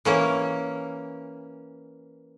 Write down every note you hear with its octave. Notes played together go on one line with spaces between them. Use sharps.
E3 A#3 C#4